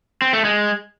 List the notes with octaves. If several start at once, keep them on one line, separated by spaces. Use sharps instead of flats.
C4
A3
G#3